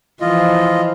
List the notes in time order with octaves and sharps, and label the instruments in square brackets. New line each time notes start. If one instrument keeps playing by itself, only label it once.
[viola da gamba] E3 F3 [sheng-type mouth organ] F4 D#5